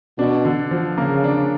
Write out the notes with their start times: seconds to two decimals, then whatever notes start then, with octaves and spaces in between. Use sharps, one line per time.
0.18 B2 D4
0.45 D3
0.71 F3
0.97 C#3 A#3
1.24 D4